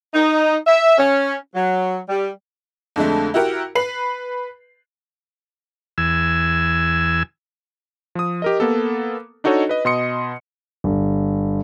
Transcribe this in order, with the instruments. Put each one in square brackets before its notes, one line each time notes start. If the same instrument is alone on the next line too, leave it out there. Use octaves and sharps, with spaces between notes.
[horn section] D#4
E5
C#4
F#3
G3
[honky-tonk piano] F2 D3 G#3 A3
E4 F#4 G4 A#4
B4 B5 C7 F#7
[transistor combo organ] E2 G#5 E6
[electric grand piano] F3 D#6
G4 A#4 D#5
A#3 B3 A4
D4 D#4 F#4 A4 C#5 D#5
B4 D#5
B2 D#5 C6 D#6 C#7
[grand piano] G1